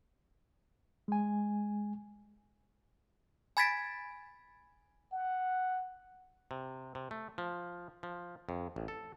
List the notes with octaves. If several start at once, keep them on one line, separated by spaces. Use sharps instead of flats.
G#3 G#5
G#5 B5 G#6 A6 B6 D7
F#5
C3
C3
A3
F3
F3
F2
A1
A4